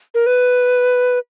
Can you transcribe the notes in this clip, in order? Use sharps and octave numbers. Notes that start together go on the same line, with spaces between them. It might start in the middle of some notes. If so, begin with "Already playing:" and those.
A#4
B4